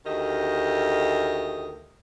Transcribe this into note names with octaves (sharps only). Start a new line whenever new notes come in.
D2 D#3 A3 G4 D#5